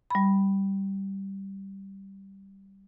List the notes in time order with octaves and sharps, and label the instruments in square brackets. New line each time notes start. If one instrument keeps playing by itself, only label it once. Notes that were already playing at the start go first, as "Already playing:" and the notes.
[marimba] G3 B5